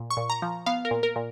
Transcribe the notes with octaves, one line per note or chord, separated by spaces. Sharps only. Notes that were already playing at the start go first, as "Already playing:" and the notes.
Already playing: A#2
C#6
A#2
A#5
F3
B3 F5
A#4
A#2
A#4
A#2